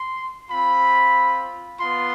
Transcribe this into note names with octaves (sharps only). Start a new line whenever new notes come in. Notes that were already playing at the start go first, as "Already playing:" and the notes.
Already playing: C6
C4 F4 B5
B3 F4 C6